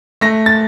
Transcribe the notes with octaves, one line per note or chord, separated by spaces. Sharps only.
A3 A#6
A6